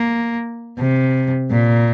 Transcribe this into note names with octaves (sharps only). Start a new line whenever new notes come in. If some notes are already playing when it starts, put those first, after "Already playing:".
Already playing: A#3
C3
A#2